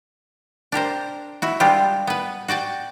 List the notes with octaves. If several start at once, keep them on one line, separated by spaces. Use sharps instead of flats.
D4 G4 A#4 C5
E4 F#4
G3 G#3 D4 F4 G4
B3 B4
F#4 D5 G5 A5